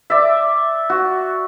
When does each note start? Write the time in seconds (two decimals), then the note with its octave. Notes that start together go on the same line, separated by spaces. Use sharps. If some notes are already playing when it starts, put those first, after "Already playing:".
0.10 D5 E5
0.90 F#4